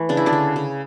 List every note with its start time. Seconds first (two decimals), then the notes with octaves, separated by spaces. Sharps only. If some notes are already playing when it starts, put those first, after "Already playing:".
Already playing: E3 A3
0.09 C#3 D4
0.17 E4
0.26 D3 D4
0.33 C#3
0.56 C#3